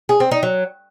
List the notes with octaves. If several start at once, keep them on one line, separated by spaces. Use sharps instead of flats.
G#4
C4
D#4
F#3